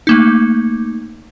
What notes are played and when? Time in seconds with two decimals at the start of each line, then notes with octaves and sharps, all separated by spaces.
0.07 A3 A#3 D#4